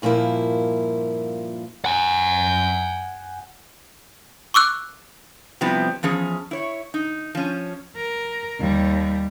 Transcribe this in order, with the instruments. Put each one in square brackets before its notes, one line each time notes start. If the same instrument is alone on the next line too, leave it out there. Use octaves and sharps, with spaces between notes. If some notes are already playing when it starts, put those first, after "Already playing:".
[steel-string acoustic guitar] G2 A#2 F3 A#3 E4
[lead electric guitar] F#5 G#5
[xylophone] C#6 D6 E6 F#6
[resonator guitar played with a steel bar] C3 F3 G3 B3 C4 E4
E2 F3 C#4 G#4
E4 C#5
D#4
F3 C#4
[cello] A#4
D#2 G3